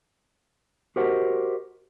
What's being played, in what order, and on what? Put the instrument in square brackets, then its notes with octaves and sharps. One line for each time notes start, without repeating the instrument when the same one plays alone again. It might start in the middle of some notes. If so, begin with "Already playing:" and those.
[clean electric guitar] F#4 G4 A#4 C5 D#5 F#5